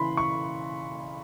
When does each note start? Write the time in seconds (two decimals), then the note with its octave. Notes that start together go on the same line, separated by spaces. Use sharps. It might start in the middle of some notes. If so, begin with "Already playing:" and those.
Already playing: C#3 E3 B5 C6
0.17 C#6